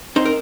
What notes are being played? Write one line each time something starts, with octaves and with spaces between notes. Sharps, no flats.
C4 D#4 C5
A#4